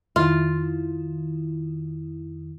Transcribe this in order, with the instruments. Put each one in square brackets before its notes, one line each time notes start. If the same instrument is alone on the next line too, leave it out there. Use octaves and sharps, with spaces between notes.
[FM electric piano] F2 D#3 E4 [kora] F4